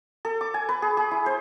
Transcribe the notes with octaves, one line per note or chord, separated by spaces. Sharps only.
A4
D6
G#5
B4
G#4
G#4
E4
C5